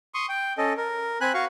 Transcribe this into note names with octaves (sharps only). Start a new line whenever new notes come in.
C6 C#6 D#6
G5
C#4 A4 D#5
A#4
C4 G#5 B5 F#6
F#4 F5 C#6